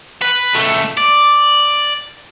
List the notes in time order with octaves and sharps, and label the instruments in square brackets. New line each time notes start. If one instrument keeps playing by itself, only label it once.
[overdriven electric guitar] B4
C#2 A3
D5